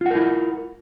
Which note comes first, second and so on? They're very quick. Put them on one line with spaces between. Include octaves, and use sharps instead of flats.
F4 F#5 A#4 E4